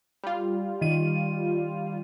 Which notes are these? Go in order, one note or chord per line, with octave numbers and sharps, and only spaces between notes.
G3 F4
D#3 D#7